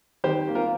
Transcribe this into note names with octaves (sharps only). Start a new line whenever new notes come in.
D#3 G4 C5
A#3
F4 A#4